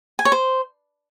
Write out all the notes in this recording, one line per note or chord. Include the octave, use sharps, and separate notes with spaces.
G#5
C#5
C5